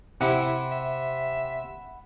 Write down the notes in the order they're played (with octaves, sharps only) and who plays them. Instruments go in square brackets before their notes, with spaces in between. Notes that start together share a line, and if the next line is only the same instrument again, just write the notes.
[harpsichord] C3 [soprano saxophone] E4 [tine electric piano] F#5 B5
[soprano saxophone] E5